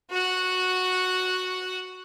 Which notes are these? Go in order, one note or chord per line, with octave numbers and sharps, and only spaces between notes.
F#4 F#5